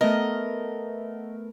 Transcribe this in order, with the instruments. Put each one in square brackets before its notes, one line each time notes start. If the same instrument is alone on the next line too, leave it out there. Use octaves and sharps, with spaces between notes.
[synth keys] A3 B3 A#4 [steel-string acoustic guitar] D#5